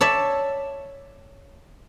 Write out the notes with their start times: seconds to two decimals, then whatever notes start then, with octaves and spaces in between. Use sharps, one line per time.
0.01 A4 C#5 D5 E5